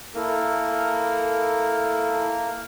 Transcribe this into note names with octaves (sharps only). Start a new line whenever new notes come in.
A#3 E4 A4 A#4